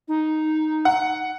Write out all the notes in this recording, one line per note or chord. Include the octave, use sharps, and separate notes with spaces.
D#4
F#5